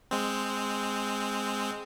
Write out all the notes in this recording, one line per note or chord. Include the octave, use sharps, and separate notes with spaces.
G#3 C4